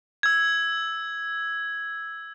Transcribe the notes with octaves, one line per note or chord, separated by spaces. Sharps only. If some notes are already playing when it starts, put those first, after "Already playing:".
E6 G#6